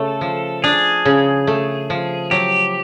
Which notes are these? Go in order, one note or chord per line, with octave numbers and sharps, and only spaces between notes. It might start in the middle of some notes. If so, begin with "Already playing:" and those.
Already playing: C#3 A3 A4
F3
D4 G#4
C#3
A3
F3
F#3 G4